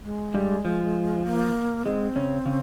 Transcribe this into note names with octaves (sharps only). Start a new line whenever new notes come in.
G#3
G2 G3
F3
A#3
G#2 G#3 C4
C#3 C#4
C#3 C#4